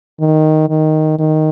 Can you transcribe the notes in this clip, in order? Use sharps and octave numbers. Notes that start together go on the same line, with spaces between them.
D#3
D#3
D#3